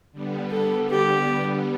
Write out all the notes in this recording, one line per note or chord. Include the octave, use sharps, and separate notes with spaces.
D3 G3 B3
A4
G4